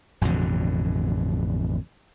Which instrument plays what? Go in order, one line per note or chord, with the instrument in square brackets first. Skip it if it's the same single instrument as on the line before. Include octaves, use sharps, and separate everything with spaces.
[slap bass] A1 F2 B2 D3